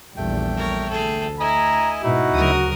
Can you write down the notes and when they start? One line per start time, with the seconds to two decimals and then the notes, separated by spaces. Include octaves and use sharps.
0.17 A#1 E2 G3 A3 G5
0.57 A#4 C#5
0.89 D2 G#4 A4
1.40 E4 D#5 G#5 A#5
2.04 G#2 B2 D#4 E4 F#4
2.34 D2 C#3 F#3 A#4 D#6